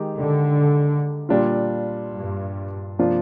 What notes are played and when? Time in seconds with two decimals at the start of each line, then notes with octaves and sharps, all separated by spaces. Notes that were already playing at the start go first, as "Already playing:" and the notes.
Already playing: D#3 G#3 D#4 G4
0.17 D3
1.29 A#2 G3 D4 F4
2.14 G2
2.99 C3 F3 A#3 D4 F4